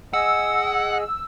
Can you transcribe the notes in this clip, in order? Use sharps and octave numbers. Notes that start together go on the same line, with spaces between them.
G#4 D#5 F#5 E6